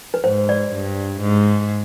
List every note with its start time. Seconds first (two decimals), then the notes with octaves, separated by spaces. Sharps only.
0.14 B4
0.24 G#2 C5
0.49 D5
0.73 G2
1.21 G#2